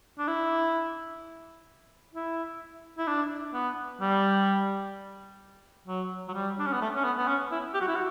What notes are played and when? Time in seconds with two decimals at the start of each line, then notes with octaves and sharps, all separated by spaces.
0.18 D4
0.28 E4
2.14 E4
2.98 E4
3.07 D4
3.54 B3
4.01 G3
5.87 F#3
6.28 F#3
6.34 G3
6.59 D4
6.66 C#4
6.73 B3
6.81 A3
6.95 C#4
7.04 B3
7.17 B3
7.27 C#4
7.51 E4
7.74 G4
7.81 F#4
7.88 E4
7.95 F#4